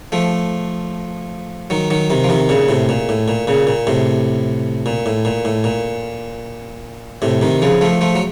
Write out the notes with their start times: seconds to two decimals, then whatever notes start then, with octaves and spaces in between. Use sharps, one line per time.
0.12 F3 A3
1.70 D#3 F#3
1.90 D#3 F#3
2.10 C3 D#3
2.24 F3
2.29 C3 D#3
2.49 A#2 C#3
2.68 A2 C3
2.89 A#2
3.09 A2
3.28 A#2
3.47 A#2 C#3
3.67 A#2
3.87 A2 C3
4.86 A#2
5.06 A2
5.25 A#2
5.45 A2
5.64 A#2
7.22 A2 C3
7.41 C3 D#3
7.62 C#3 F3
7.81 F3 A3
8.01 F3 A3
8.16 F#3